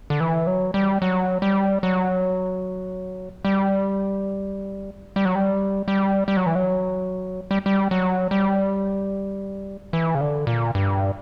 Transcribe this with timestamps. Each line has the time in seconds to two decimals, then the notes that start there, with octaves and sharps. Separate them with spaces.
0.10 D3
0.20 E3
0.47 F#3
0.74 G3
1.02 F#3
1.42 G3
1.83 F#3
3.45 G3
5.16 G3
5.25 F#3
5.35 G3
5.88 G3
6.28 G3
6.37 F#3
6.46 E3
6.55 F#3
7.51 G3
7.66 G3
7.91 F#3
8.31 G3
9.93 E3
10.15 C#3
10.21 D3
10.47 A#2
10.75 G2